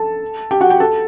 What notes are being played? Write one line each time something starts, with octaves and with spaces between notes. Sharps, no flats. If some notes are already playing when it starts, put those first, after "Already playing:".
Already playing: A4 A5
G4 G5
F#4 F#5
G4 G5
A4 A5